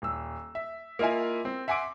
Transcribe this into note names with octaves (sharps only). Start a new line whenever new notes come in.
D#1 E6
E5
A#3 E4 F4 D#5 E5 G#5
C4
E5 F#5 G#5 C6 D6 D7